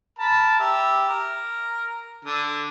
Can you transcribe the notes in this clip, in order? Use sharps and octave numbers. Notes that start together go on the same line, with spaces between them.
A#4 A5 B5
G4 E5
A#4
D3